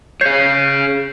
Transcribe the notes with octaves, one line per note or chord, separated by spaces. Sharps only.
G#4 C#5 G6 C7